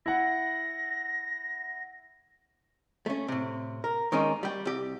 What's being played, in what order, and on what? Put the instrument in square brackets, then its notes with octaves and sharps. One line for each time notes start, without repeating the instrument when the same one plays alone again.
[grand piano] E4 F#5 [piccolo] A#6
[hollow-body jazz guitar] A3 C#4
A2 C3
A#4
D#3 G#3 A#3 C#4 D#4
G3 G5
C2 G4